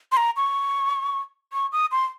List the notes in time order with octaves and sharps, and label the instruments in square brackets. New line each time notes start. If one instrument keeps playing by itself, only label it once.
[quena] C6
A#5
C#6
C#6
D#6
C6